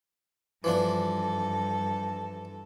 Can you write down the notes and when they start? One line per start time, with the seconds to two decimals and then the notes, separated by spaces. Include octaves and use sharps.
0.64 G2 E3 F3 D4 A4